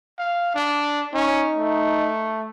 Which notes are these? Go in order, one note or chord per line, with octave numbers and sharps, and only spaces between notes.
F5
D4
C#4 D#4
A3